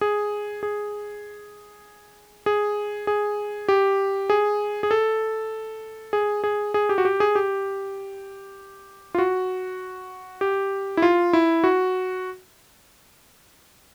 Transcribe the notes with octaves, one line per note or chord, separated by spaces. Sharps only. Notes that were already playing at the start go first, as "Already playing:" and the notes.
G#4
G#4
G#4
G#4
G4
G#4
G#4
A4
G#4
G#4
G#4
G4
F#4
G4
G#4
G4
F4
F#4
G4
E4
F4
E4
F#4